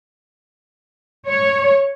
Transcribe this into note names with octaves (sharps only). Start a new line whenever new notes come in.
C#5